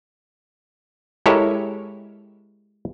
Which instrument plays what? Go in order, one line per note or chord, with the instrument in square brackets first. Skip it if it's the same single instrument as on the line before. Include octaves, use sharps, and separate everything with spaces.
[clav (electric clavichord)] G#3 E4 G4 A4 A#4 C#5